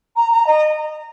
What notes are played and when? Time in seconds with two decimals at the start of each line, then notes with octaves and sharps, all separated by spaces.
0.16 A#5
0.32 A#5
0.47 D#5